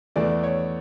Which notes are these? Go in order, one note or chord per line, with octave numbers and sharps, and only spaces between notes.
E2 E3 A3 D5
C#5